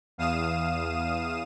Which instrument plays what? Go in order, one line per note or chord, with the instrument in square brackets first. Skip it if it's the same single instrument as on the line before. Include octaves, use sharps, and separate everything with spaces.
[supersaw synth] E2 F5 D#6 D#7 E7